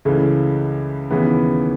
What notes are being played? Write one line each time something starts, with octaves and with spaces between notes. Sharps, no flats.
C#2 C#3 E3 A3
D#2 C#3 E3 B3 E4